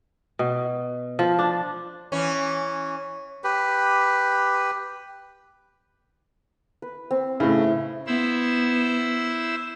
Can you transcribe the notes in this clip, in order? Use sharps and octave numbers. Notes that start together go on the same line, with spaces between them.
B2
F3
D4
E3 C#4
G4 B4
B4
C4
A2 C#3 E4 B4
B3 E4 C5 E6